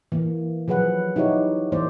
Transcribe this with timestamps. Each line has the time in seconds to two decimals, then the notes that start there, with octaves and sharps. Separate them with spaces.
0.12 E3 A#3
0.68 F3 F#3 G#4 B4 F#5
1.16 D#4 E4 F#4 G4 C#5
1.72 E3 A#3 C5 D5